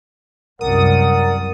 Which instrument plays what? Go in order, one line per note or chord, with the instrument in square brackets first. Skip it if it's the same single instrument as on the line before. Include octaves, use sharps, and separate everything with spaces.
[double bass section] C2 F#2 [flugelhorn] A#4 [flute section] D5 F#5 [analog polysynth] D#6